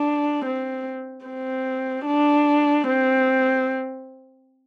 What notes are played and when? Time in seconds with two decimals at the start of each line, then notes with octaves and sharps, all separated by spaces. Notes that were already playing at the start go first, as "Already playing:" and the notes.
Already playing: D4
0.45 C4
1.26 C4
2.06 D4
2.88 C4